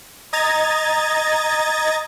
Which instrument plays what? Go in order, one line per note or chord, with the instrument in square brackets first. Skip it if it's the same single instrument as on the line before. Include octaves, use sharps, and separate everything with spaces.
[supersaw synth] D#5 A#5 G#6 A6